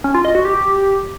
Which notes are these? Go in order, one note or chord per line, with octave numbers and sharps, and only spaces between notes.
C#4
F4
D#5
F#4
G4